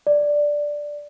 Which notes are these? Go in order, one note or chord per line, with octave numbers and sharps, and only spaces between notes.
D5